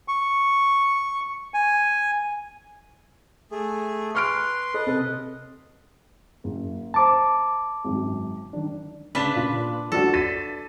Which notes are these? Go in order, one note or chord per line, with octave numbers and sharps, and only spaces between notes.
C#6
G#5
A3 G#4
B4 C6 C#6 F6 D7
A4 B4 D#5
C3 A4
F#1
C5 A5 A#5 D6
G#1 F#2
D#3 D4
C#3 D4 B4 B6 E7
A#2
F3 D4 F#4 A4
A6 B6 D#7